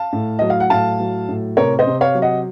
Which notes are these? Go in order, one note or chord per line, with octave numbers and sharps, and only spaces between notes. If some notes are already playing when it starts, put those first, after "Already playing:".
Already playing: F5 A5
A2
F#3 D#5
F5
F#5
A2 F5 A5
F#3
A2
C3 A#4 C#5
C5 D#5
C3
C#5 F5
F#3
D#5 F#5